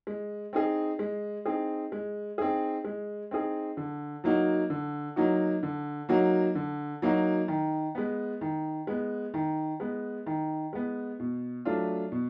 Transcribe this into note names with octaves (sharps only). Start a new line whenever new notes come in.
G#3
C4 D#4 G#4
G#3
C4 D#4 G#4
G#3
C4 D#4 G#4
G#3
C4 D#4 G#4
D3
F#3 A#3 D#4 F#4
D3
F#3 A#3 D#4 F#4
D3
F#3 A#3 D#4 F#4
D3
F#3 A#3 D#4 F#4
D#3
G#3 B3
D#3
G#3 B3
D#3
G#3 B3
D#3
G#3 B3
B2
F#3 A3 D4 F4
B2